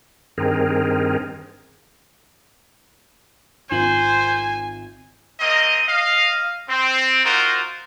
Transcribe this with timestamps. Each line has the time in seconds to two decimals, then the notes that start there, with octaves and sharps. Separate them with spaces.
0.38 G2 D#3 C4 G#4 A#4
3.71 G#1 F4 C5 G#5 F#7
5.40 A#3 C4 D#5
5.87 D#5 F5
6.69 C4
7.24 D#4 F4 F#4 A#4 C5